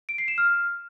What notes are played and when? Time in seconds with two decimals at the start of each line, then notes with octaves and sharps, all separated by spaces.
0.09 D7
0.18 C7
0.28 E7
0.38 F6